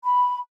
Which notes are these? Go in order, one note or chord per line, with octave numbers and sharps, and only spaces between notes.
B5